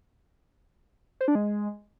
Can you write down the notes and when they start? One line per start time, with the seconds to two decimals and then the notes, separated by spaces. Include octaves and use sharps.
1.21 C5
1.28 D4
1.35 G#3